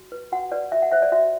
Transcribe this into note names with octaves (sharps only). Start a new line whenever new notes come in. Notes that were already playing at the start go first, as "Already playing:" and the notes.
Already playing: F#4
B4
F#4 F#5
B4 D5
F#4 E5
F#5
C5 E5
D5
F#4 E5